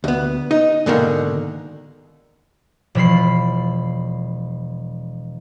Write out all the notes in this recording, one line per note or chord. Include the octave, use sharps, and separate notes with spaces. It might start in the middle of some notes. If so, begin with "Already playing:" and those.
D2 B3
D#4
G#2 B2 D3 D#3 A#3
E1 F3 B5 C7